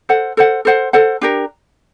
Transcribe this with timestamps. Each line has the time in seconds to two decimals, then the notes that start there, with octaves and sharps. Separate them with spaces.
0.09 A4 C5 F#5
0.37 A4 C5 F#5
0.65 A4 C5 F#5
0.93 A4 C5 F#5
1.21 D4 G4 A#4